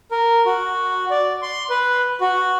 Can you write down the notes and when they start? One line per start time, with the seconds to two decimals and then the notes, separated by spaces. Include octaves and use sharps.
0.11 A#4
0.46 F#4
1.10 D5
1.42 C6
1.70 B4
2.21 F#4